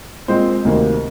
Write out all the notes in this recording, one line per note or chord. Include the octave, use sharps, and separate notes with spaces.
A#2 G#3 C4 C5
D2 C3 D#3 A#3